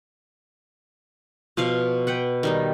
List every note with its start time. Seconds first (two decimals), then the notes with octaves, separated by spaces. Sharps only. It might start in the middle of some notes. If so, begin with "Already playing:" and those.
1.57 B2 F3 F5
2.07 B4 F#5 G5
2.43 D#3 G3 D#4